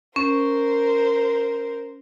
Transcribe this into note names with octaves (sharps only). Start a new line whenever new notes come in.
C#4 A#4 C5